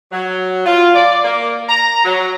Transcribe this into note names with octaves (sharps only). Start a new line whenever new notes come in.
F#3
F4
D5
A#3
A#5
F#3